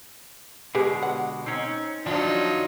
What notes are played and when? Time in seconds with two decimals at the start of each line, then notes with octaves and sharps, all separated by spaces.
0.75 B2 D3 G#3 G4 G#4 B4
1.03 F#5
1.46 C4 C#4 D#4
2.06 F#2 D#3 F3 F#3 D4 D#4 F4